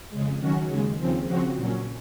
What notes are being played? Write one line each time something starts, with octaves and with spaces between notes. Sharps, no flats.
F2 C#3 G#3
D#3 F#3 C#4 F#4
D#2 C#3 G#3
D#2 C#3 F3 C4
C#3 F3 C4 F#4
A#2 F#3 C#4